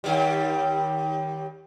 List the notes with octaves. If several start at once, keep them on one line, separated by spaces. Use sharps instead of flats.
D#2 G3